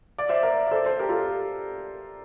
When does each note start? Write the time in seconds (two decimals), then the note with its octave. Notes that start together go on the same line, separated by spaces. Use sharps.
0.18 D5
0.29 C5 E5
0.43 A#4 D5
0.67 D5
0.71 A4 C5
0.85 A4 C5
0.99 G4 A#4
1.09 F4 A4